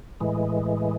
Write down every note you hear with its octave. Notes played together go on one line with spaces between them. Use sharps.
A2 E3 G#3